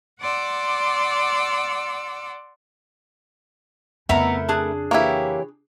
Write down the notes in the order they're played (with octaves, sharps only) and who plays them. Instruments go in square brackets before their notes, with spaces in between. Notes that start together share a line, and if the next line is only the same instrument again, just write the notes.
[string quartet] D5 F#5 C6 D6 E6
[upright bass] F2 C#3 [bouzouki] A3 E4 A#4 [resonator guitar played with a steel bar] B3 E5 A#5
[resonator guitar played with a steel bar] D4 G#4
[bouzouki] E3 G4 C#5 [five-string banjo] A#3 E4